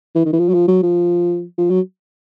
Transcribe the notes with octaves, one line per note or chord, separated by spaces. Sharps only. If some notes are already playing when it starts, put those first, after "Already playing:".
E3
D#3
E3
F3
F#3
F3
F#3
F3
F3
F#3